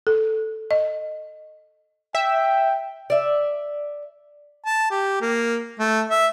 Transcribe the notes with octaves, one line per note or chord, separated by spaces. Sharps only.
A4
D#5
E5 G5
D5 E5
A5
G4
A#3
A3
E5